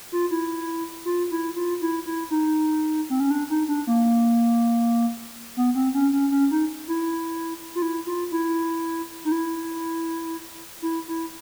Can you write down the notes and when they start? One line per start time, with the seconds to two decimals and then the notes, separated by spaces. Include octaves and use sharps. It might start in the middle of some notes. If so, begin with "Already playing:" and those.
0.12 F4
0.31 E4
1.05 F4
1.31 E4
1.56 F4
1.82 E4
2.06 E4
2.30 D#4
3.10 C4
3.20 C#4
3.31 D4
3.50 D#4
3.68 D4
3.87 A#3
5.57 B3
5.75 C4
5.94 C#4
6.13 C#4
6.31 C#4
6.51 D#4
6.88 E4
7.75 F4
7.82 E4
8.07 F4
8.32 E4
9.25 D#4
9.32 E4
10.82 E4
11.08 E4